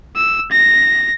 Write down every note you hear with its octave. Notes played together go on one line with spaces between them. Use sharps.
E6
A#6